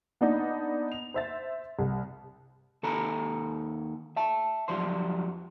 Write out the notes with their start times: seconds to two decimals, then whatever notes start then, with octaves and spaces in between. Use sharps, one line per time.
0.21 B3 D4 D#4
0.92 F7
1.14 C5 E5 A6
1.79 C2
2.83 D#2 A4 G#5 A#5 B5
4.16 E5 A5
4.68 F2 F#3 G3 C5 C6